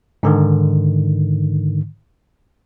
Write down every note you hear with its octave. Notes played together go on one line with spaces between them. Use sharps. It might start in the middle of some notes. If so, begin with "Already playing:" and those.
G#2 D3 D#3